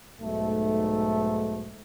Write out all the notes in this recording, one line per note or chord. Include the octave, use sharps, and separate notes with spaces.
B1 G#2 A3